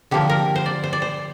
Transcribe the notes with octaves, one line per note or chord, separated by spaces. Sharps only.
D3 F3 A#3 G4
A#4
C5
D5
C5
D5
C5